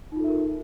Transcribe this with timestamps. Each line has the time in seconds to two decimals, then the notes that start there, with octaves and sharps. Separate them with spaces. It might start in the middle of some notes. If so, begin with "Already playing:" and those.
0.12 D#4
0.16 F4
0.20 A4
0.24 E5
0.28 A#4